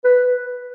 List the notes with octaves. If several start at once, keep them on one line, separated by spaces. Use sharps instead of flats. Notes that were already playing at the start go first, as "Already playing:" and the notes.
B4